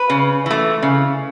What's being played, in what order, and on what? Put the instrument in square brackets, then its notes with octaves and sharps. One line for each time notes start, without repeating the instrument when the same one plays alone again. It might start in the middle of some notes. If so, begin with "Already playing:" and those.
Already playing: [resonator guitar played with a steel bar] B4
C#3
E3 A3
C#3